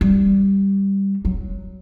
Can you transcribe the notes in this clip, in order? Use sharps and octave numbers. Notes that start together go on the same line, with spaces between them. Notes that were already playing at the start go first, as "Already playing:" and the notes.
G3
F#3